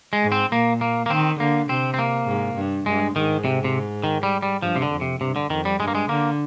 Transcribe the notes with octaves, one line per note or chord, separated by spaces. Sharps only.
G#3
G#2
C4
A#2 A#3
A#3
A#3
D#3 C4
D3 A#3
C3 C4
C4
A#3
G#2
G2
G2 G#3
G#2 D#3
C3
C3
D#3
G3
G3
G2 F3
C3
D3
F2
C3
G2 C3
D3
F2 D#3
G3
G2 G#3
A#3
G#3
D3 A#3